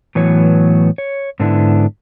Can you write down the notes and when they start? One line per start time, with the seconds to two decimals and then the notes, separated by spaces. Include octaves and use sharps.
0.15 A2 E3 F#3 B3 C#5
0.98 C#5
1.40 G#2 D3 B3 D4 E4